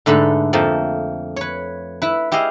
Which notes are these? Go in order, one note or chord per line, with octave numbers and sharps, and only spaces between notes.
G#2 D3 A3 B4 B5
F2 F3 A3 A#3
B4 C#5
E4 B4
E4 G4 G#4 D#5 F5